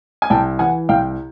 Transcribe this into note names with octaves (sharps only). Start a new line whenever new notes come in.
G#5
C2 G5 A5
E3 F#5 G#5
C2 F5 G5